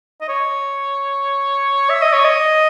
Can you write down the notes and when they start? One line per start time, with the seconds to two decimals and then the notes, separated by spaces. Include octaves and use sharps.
0.21 D#5
0.29 C#5
1.90 E5
2.02 D#5
2.13 C#5
2.25 D#5